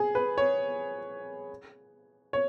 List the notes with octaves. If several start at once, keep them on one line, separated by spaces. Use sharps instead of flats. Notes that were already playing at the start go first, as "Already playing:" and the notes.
Already playing: G#4
B4
C#5
C#5